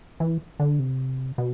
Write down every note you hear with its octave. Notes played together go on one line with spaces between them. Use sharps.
E3
D3
C3
B2